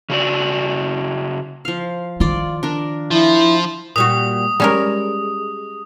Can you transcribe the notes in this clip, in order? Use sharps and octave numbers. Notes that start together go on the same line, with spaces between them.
C#3 F#4 D5
F3 F5
D#3 F4 D5
D4 A#4
F3 E4
A#2 G3 F#4 D#6
G3 G#3 C#4 A#4